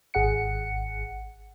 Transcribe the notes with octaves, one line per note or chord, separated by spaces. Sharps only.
G#1 G#4 F#5 C#7